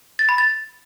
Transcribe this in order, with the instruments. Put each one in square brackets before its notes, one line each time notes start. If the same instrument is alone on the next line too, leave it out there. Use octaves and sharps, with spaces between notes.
[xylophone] A6
B5
A6